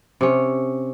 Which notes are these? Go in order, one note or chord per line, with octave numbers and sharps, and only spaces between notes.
C3 C#4